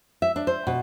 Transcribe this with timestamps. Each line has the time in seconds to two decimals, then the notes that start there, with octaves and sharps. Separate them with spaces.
0.22 E5
0.36 D4
0.47 C5
0.67 B2